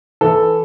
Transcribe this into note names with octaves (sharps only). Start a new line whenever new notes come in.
E3 A4